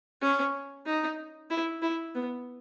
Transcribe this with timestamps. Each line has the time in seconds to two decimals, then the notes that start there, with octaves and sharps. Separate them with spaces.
0.22 C#4
0.86 D#4
1.50 E4
1.82 E4
2.15 B3